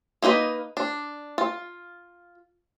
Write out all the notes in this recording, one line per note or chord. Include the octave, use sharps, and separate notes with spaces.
A#3 D#4 B4 D#5
D4
F4